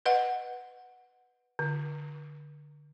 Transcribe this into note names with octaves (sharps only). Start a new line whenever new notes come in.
B4 D#5 F#5
D3